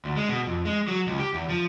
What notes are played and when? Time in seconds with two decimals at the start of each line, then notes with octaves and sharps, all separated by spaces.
0.05 D2
0.17 G#3
0.29 B2
0.47 F2
0.65 G#3
0.88 F#3
1.07 C#2
1.19 G4
1.34 E2
1.50 F3